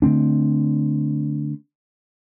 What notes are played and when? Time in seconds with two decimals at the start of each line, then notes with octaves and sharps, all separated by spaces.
0.02 D3 A3 C4 D4